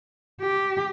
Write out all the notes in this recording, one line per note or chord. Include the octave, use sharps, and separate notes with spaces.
G4